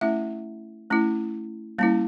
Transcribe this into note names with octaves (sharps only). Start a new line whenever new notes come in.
A3 C#4 E4 E5
A3 C#4 E4
G3 A#3 C#4 E4